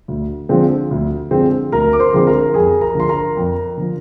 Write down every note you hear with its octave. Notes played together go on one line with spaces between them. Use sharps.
D2
D3 F3 G#3 C4
D2
D3 F3 G#3 C4
D2 A#4 A#5
D6
C5 C6
D3 F3 G#3 C4 C6
A#4 A#5
F2 G#4 G#5
A#4 A#5
D3 F3 C6
A#4 A#5
F2
D3 F3